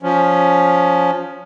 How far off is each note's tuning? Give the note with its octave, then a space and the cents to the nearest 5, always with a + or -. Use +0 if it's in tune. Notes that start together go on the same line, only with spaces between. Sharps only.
F3 +15 C#4 +15